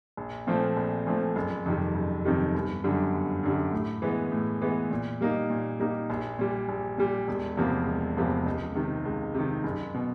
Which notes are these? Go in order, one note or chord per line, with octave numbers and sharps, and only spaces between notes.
A#1
A#2 F3 A3 C4
A#1
A#2 F3 A3 C4
F#1
F2 C3 D#3 G3
F#1
F2 C3 D#3 G3
G1
F#2 D3 G3
G1
F#2 D3 G3
A2
E3 G#3 B3
A2
E3 G#3 B3
A#2
G3 A#3 D#4
A#2
G3 A#3 D#4
A#1
A#2 G3
A#1
A#2 G3
E1
E2 C3 F3 A#3
E1
E2 C3 F3 A#3
C#2
C3 D#3
C#2
C3 D#3
F#1
B2